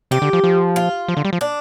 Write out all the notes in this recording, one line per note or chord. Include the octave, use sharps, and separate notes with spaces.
C3 G4
D3
F3
F3
F4
F3
D3
G3
F3
D4